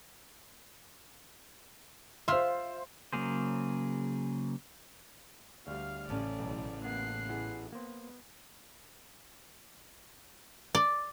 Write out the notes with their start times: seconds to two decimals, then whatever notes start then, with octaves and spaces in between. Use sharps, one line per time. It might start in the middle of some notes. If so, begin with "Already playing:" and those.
2.28 F4 C5 E5 C6
3.13 C#3 F#3 A#3 G#4 C5
5.67 D2 G3 F5 F6
6.09 A1 A2 C#3 C#4 D5
6.39 B1
6.84 A#3 B3 F#6 C7
7.29 B3 E4 G#4
7.72 A#3 B3 C5
10.75 D5